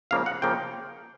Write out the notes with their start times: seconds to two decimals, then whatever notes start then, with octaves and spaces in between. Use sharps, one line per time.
0.11 C#2 C#3 F3 A#3 F5
0.26 F#5
0.42 C#3 F3 A#3 G5